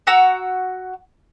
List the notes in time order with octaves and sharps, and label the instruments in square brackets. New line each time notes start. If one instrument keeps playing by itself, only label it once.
[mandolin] F#4 F#5 A#5 E6